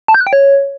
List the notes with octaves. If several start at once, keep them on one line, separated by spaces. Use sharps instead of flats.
A5
G6
F#6
G5
C#5